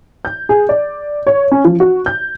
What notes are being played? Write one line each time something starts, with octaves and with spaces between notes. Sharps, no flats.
G6
G#4
D5
C#5
C#4
F3
F#4
G6